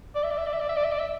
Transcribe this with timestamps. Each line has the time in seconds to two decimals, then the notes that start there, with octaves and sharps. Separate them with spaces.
0.15 D5
0.24 E5
0.31 D5
0.38 E5
0.46 D5
0.53 E5
0.60 D5
0.69 E5
0.76 D5
0.84 E5
0.92 D5
0.99 E5